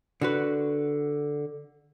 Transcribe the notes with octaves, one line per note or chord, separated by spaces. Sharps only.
D3 F#4 B4